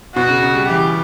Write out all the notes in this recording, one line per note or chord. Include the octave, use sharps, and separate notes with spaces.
B2 F#4
C#3
C#3
G3
E3 G4